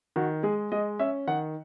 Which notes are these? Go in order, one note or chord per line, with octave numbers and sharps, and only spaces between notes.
D#3 F#4
G#3 G#4
G#3 D#5
C#4 E5
D#3 F#5